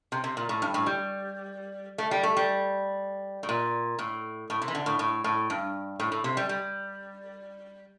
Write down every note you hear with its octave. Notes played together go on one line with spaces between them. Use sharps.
C3
C3
A#2
A2
G2
A2
G3
A3
G3
A3
G3
A2
A#2
A2
A2
C3
E3
D3
A2
A2
A2
G2
A2
A2
C3
G3
G3